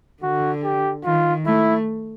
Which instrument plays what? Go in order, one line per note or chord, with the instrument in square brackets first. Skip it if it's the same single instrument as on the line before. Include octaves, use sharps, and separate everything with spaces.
[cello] D3 [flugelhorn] F#4
[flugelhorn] G4
[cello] D#3 [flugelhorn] F4
[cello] A3 [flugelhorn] E4